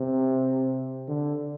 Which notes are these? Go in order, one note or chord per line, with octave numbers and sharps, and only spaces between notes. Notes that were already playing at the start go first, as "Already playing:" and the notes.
Already playing: C3
D3